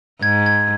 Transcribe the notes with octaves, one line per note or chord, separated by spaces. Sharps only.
G#2 G#6
G#6